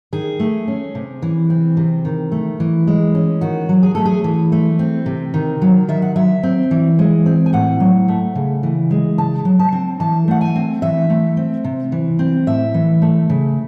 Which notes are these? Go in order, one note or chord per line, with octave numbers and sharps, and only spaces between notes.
D#3 G#4
A3
C#4
C3
E3
C4
C3
D#3
A3
E3
G#3
C#4
D#3 F#4
F#3
G#4
A3 A4
G#4
E3
A3
C4
C3
D#3
F#3
D#3 E5
F#5
F#3 E5
C4
E3
G#3
C4
G#5
A2 F#5
F#3
A3
C#3
E3
G#3
C#3 A5
F#3
A5
C4
E3 A5
A3 F#5
G#5
C4
E3 E5
A3
C4
C3
E3
C4
A2 E5
E3
A3
C#3